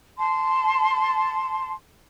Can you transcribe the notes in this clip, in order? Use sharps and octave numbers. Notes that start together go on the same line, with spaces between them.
A5 C6